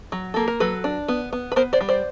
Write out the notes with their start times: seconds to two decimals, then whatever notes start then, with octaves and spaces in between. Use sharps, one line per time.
0.12 F#3
0.34 A#3 A4
0.48 A#4
0.60 F#3 A4 B4
0.84 D4
1.08 B3
1.33 B3
1.52 B4
1.56 B3 A#4 C5
1.73 C5 D5
1.81 G3
1.89 C5 D5